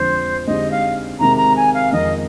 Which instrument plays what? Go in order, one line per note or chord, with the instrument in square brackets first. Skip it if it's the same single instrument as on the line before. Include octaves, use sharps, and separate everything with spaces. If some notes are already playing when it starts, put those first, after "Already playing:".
Already playing: [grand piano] F2 D3 F3 G#3 D4 [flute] C5
[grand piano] D3 G#3 C4 D#4 G4 [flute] D#5
[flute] F5
[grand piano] C3 D#3 G#3 [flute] A#5
[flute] A#5
G#5
F5
[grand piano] F2 D#3 G#3 [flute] D#5